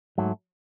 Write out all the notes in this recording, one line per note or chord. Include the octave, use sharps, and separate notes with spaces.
G#2 F#3 A3